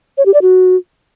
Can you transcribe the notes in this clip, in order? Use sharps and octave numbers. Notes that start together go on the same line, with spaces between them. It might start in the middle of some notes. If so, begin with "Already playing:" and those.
C#5
G4
D5
F#4